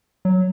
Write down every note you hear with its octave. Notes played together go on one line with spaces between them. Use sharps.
F#3